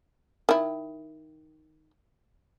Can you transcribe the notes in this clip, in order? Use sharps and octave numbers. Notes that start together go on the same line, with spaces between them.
D#3 E4